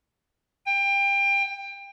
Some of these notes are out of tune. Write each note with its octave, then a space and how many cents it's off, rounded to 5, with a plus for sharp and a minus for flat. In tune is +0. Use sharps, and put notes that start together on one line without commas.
G5 +25